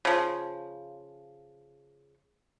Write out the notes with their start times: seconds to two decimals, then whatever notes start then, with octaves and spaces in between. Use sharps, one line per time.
0.05 C#3 F3